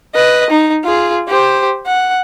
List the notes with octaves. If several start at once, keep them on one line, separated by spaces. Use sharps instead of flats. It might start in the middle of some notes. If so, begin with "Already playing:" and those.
B4 D#5
D#4
F4 G#4
G4 C5
F#5